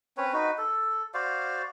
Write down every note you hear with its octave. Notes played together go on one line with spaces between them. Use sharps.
C4 C#4 B4 C#5
D#4 F#4 B4
A4
F#4 C5 D5 F5